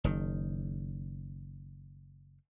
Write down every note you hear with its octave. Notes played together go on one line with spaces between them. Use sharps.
F#1 D#3